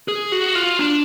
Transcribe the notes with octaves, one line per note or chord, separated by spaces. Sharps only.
G#4
F#4
F4
D4